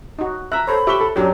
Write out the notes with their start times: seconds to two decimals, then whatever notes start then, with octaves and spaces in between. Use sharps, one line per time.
0.19 D#4 F#4
0.52 E5 A#5 F#6
0.67 A4 C5 C#5 B5
0.87 G4 E5 C#6 G7
1.01 A4
1.16 F#2 F#3 D4 G4 C#5